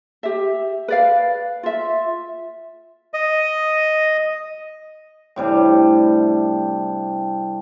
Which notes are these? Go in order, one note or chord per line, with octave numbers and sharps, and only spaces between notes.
G4 E5
B4 D5 F5
F4 E5
D#5
A2 C3 G3 D4